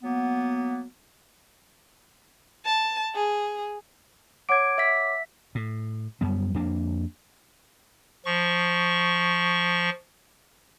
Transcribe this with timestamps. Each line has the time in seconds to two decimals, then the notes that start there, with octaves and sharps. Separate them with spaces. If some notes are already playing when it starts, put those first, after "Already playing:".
0.02 F#3 A#3 B3
2.65 A5
3.15 G#4
4.49 C#5 F#5 D6 G#6 D7
4.78 E5 B6
5.55 A2
6.21 F#2 G3 B3
6.54 F2 A#3 D4
8.25 F3 C#6